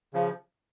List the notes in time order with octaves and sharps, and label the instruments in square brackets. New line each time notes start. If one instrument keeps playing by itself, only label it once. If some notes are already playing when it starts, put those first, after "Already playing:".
[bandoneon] C#3 F3